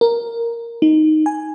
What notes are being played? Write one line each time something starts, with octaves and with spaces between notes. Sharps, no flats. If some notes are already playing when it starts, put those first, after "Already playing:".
A#4
D#4
G#5